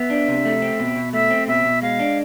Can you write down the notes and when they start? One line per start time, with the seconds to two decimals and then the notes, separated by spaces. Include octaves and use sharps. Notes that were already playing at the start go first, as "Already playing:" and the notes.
Already playing: B3 E5
0.10 D4
0.28 C3
0.45 A3
0.62 C4
0.80 B2
0.96 B2
1.13 A3 E5
1.30 C4
1.48 B2 E5
1.65 B2
1.82 G#3 F5
1.99 D4